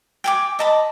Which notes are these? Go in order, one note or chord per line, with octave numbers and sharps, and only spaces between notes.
G5 G#5 D6
D#5 A5 B5